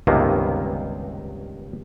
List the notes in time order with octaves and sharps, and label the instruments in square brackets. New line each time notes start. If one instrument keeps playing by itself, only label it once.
[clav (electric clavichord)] C#2 G2 C3 D#3 A#3 B3